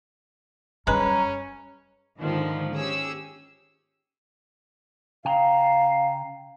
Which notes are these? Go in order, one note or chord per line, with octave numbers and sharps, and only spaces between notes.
F#2 G3 G#3 C#4 B4 A#5
G#2 D3 D#3 F3
C#4 G4 G#4 E6
C#3 F5 G5 A#5